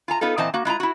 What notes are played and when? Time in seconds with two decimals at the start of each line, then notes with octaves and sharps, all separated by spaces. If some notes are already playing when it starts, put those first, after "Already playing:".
0.08 F4 G#5 A#5
0.21 B3 D#4 F4 A4
0.38 A#2 E3 C4 C5 D#5 A5
0.54 A#3 F#4
0.65 G#3 E4 F4 A#5
0.80 E4 F#4